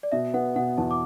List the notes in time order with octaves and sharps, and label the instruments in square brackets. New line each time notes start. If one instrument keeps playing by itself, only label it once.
[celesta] D5
[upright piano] B2 [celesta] E5
[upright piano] B3 [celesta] F#5
[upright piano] B2 [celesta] F#5
[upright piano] E2 [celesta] A5
[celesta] D6